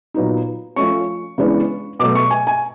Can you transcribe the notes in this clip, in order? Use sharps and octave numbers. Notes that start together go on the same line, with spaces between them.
A#2 F#3 B3 D#4
F3 A3 C#4 C#6
C#3 E3 G#3 B3 D4
B2 F#3 A3 D6
C#6
G#5
G#5